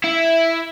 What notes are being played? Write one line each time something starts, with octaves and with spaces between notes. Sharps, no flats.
E4